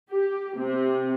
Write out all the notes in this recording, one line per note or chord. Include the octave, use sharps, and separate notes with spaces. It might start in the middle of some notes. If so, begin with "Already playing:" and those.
G4
C3